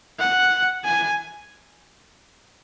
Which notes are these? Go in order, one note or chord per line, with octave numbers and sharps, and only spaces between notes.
F#5
G#5